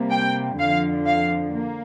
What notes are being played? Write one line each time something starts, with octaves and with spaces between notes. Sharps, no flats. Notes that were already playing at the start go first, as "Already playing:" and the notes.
Already playing: C3 G3 A#3
G5
F2 D3 F3 F5
F5
A#3